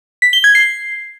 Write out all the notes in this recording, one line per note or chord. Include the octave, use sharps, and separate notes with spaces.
B6
G7
G#6
C7